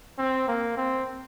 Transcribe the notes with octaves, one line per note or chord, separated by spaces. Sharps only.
C4
A#3
C4